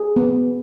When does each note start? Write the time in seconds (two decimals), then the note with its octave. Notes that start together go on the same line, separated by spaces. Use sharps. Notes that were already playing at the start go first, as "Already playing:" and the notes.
Already playing: G#4
0.16 B3